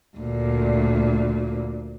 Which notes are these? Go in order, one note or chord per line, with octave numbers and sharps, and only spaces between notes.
D2 A#2